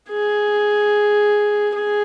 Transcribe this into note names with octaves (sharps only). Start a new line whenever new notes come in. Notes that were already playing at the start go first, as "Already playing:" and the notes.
G#4
G#4